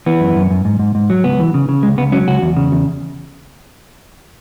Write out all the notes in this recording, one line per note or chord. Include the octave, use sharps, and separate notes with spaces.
E3 B3
F#2
F#2
F#2
G#2
G#2
G#2
F#3
C#2 B3
E3
C#3
C#3
C#2 G#3
C#2 B3
F#3 C#4
C#2 F#4
E2
C#3
E2